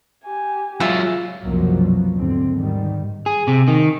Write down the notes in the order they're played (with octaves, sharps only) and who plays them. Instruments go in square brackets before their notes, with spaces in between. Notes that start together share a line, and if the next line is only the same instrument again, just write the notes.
[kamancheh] G4 G#5
[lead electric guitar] F#3 G#3 [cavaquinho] F4 E5
[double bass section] C2 F#2 B2 F3 F#3 A#3
B2
D#2 G#2 D3 C4
G#2 D#3 G3
[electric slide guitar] G#4
C3
D#3